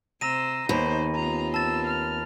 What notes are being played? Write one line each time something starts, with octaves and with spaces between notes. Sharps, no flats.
C3 C5 A#5 E6 A#6 D#7
D#2 D#3 B3 D#4 C5 B5
B3 C4 F4 A#5
A5 E6 A6
F6